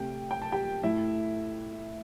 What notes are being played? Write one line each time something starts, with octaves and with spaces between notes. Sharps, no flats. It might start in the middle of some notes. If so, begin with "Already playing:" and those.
Already playing: C3 A3 G4 G5
G5
A5
G4 G5
A2 A3 E4 E5